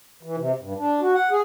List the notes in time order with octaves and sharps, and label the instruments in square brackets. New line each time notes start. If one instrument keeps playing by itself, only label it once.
[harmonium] E3
C3
G2
D4
F#4
F#5
G#4